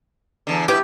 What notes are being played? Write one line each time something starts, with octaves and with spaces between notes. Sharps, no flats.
E2 D3
B2 E4 G4 B4